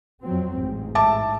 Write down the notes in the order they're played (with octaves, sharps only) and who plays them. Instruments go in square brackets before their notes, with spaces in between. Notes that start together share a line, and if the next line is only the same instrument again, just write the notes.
[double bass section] F2 F#3 C4
A1 G#2
[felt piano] E5 A5 D6